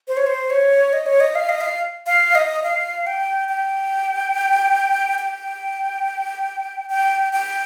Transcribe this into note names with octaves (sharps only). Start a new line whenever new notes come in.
C5
C#5
C5
C#5
D#5
C#5
D#5
F5
D#5
F5
F5
D#5
F5
G5
G5
G5
G5
G5